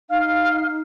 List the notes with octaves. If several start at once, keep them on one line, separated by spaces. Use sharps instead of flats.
D#4 F5 F6